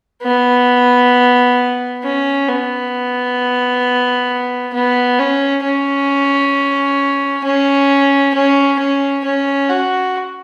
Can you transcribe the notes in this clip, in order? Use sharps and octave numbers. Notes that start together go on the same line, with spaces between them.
B3
C#4
B3
B3
C#4
C#4
C#4
C#4
C#4
C#4
F#4